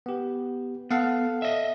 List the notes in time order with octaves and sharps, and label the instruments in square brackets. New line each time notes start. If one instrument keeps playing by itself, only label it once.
[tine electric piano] B3 G4
[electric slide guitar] B3 [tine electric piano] A4 F5 F#5
[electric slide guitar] D#5 E5